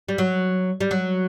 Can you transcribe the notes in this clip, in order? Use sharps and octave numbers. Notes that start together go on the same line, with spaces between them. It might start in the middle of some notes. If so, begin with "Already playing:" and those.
G3
F#3
G3
F#3